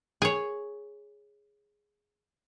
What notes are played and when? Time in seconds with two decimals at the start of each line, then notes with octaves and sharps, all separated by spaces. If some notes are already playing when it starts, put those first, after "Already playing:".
0.22 G#4 C#5